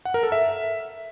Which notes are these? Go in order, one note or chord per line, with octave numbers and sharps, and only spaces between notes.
F#5
A#4
A4
E5